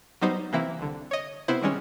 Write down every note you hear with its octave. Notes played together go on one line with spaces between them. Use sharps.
F#3 G3 B3 D#4 C5
C3 E3 A#3 C4 E4
C2 D3
C#5 D#5
C3 B3 E4 C5
D#3 G3 G#3 C#4